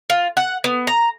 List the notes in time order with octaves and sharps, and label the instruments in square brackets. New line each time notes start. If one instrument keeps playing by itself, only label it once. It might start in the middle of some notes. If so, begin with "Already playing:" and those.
[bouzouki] F4
F#5
B3
A#5